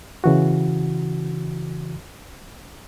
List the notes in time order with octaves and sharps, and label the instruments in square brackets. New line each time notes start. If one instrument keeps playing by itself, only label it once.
[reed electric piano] C#3 E3 F#4